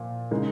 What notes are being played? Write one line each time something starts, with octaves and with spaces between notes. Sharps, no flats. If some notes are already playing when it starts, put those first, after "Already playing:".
Already playing: A#2 F3 A#3
C#3 G#3 D#4 A#4